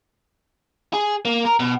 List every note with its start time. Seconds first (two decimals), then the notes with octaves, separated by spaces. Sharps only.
0.94 G#4
1.25 A#3
1.45 A#4
1.60 B2